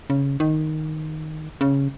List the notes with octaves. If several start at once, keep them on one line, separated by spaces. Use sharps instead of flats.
C#3
D#3
C#3